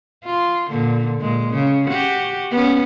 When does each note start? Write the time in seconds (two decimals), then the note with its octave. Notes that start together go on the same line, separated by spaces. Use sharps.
0.25 F4
0.70 A#2 D3
1.20 A#2 G#3
1.51 C#3
1.87 F#4 G4
2.51 B3 C#4